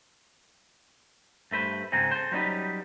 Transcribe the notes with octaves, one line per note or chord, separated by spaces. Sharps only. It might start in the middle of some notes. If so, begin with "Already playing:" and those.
G2 A3 B4 C5
G#2 C#3 G#3 C4 D#4
A4 C5
F#3 G3 C#4 D#4 B4